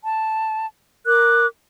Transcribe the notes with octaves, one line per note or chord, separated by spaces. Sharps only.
A5
A#4 D6 F#6